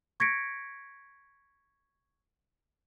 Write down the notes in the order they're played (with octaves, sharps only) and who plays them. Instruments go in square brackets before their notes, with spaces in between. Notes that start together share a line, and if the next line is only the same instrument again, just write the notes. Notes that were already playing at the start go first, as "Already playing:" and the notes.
[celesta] C#6 G#6 A#6 B6 C#7 D7